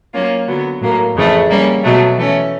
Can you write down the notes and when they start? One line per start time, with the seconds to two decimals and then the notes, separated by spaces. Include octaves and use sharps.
0.13 F#3 A#3 C#4 F4
0.47 D3 F#3 B3
0.81 A2 F#3 A#3
1.15 F2 C#3 E3 A3
1.50 G3 A#3 C#4
1.83 B2 F#3 A3
2.17 E3 A3 C#4